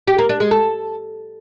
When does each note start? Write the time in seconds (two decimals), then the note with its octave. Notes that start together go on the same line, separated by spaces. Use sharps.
0.07 G4
0.18 A#3
0.29 D4
0.40 G#3
0.51 A4